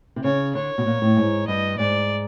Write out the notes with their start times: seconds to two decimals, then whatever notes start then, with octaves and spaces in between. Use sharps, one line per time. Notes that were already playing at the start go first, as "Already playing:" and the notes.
0.16 C3
0.24 C#3 C#5
0.55 D3 C#5
0.78 B2
0.86 A#2
1.02 A2
1.17 G#2
1.47 G2 D#5
1.79 G#2 D5